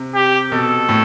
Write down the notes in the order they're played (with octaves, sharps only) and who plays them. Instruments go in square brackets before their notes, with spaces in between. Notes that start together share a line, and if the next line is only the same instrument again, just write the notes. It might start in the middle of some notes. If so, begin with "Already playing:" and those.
Already playing: [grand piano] C3
[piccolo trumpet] G4
[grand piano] B2 [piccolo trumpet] A4
[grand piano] A2